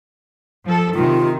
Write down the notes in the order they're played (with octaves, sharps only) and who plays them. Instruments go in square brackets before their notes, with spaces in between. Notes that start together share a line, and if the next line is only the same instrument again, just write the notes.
[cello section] F3 A4
[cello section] C3 D#3 [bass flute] F4